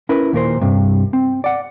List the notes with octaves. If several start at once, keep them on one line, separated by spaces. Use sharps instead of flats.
C#4 E4 A#4 B4
D#2 A#2 A#4 C5
G2 C3
C4
D5 F#5